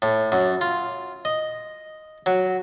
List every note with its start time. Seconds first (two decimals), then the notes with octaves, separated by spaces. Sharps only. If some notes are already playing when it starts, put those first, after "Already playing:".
0.02 A2
0.32 F#2
0.61 F4
1.25 D#5
2.26 F#3